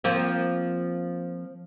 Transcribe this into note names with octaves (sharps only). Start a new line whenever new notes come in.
F3 A#3 C4